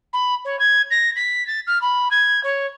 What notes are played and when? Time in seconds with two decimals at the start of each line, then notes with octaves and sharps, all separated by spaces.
0.13 B5
0.45 C#5
0.59 G#6
0.91 A#6
1.16 B6
1.47 A6
1.67 F6
1.82 B5
2.11 G#6
2.44 C#5